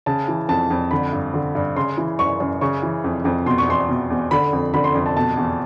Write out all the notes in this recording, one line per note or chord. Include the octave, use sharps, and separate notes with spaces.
C#3 A5
E3
F2 A5
F2
D3 B5
G2
D3
G2
C#3 C6
E3
F#2 C#6
F#2
C#3 C#6
E3
F2
F2
B2 C6
C#6
E2 C6
B2
E2
D3 B5
F2
D3 B5
C6
F2
A5
B2 A5
E2